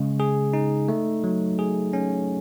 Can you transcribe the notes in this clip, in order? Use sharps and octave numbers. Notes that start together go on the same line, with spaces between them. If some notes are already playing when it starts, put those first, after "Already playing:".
Already playing: C#3 G#3
G#4
D#4
A3
F#3
G#4
C#4